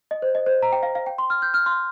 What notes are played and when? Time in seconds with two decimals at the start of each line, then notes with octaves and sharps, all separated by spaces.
0.11 D#5
0.22 C5
0.35 D#5
0.46 C5
0.62 A#5
0.72 G5
0.83 F5
0.95 F5
1.06 G5
1.18 C6
1.30 F6
1.42 G6
1.54 F6
1.66 C6